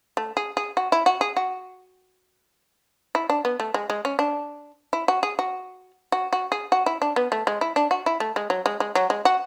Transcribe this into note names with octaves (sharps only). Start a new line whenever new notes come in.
A3
G#4
G#4
F#4
E4
F#4
G#4
F#4
E4
D4
B3
A3
G#3
G#3
C#4
D4
E4
F#4
G#4
F#4
F#4
F#4
G#4
F#4
E4
D4
B3
A3
G#3
E4
D4
F#4
E4
A3
G#3
F#3
G#3
G#3
F#3
G#3
F#4